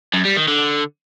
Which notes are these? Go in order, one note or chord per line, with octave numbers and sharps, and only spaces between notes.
F#2
G3
D#3
D3